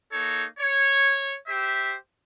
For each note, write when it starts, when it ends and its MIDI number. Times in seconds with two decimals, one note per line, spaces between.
0.13 0.45 58
0.13 0.45 63
0.13 0.45 69
0.13 0.45 73
0.59 1.35 73
1.48 1.95 67
1.48 1.95 72
1.48 1.95 76